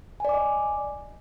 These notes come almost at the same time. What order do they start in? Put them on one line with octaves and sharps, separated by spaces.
G#5 D5 D6 D#5